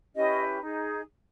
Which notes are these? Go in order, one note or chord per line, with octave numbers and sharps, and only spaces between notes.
C#4 E4 G4 B4 D#5
D#4 G#4